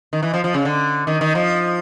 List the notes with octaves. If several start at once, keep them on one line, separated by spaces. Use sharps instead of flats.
D#3
E3
F3
F3
C#3
D3
D#3
D#3
F3